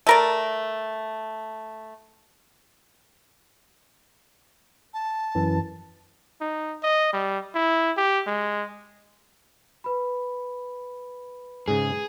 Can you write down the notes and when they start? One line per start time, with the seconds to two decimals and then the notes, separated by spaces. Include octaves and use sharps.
0.07 A3 A#4 D5
4.94 A5
5.35 F#2 E3
6.41 D#4
6.83 D#5
7.13 G3
7.54 E4
7.97 G4
8.27 G#3
9.84 B4 B5
11.68 G#2 C#3 G#4